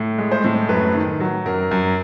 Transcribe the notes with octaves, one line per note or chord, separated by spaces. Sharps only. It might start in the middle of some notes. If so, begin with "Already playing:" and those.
Already playing: A2
G#3
C5
A2
F#2 B4
D#3
F#3
F#2 A#4
F#2